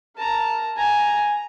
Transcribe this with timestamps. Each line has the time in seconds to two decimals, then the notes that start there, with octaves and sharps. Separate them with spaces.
0.18 A#4 A5 A#5
0.78 G#5 A#5